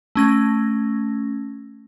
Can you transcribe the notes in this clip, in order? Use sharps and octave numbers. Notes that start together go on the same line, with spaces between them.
A3 C#4 A#6